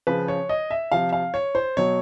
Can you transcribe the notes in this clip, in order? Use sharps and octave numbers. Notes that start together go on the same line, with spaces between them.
C#3 F3 B4
C#5
D#5
E5
C3 F3 F5
F5
C#5
C5
B2 F#3 C#5